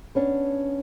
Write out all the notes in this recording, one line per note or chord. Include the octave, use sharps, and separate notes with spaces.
B3 C#4 D4